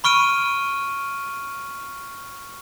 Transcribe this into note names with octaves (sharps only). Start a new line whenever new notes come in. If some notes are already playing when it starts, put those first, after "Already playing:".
B5 C#6 F6 D7 D#7